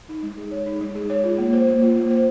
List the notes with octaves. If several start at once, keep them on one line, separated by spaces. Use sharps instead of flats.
D#4
G#3
G#4
C#5
D#4
G#3
G#4
C#5
F4
A#3
C5
A#3
F4
A#3
C5